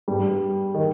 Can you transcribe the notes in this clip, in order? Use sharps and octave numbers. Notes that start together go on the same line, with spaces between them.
G2 G3
D#3